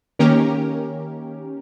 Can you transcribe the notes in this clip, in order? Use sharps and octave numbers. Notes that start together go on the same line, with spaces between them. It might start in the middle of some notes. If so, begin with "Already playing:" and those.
D#3 A#3 C#4 G4 A#4